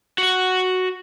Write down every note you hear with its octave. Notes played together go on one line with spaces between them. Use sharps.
F#4 F#5